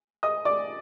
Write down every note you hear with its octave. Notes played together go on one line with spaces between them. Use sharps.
D#5 D#6
D5 D6